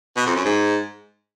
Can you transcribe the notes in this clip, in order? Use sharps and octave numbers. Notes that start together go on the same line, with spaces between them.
B2
F2
F#2
G#2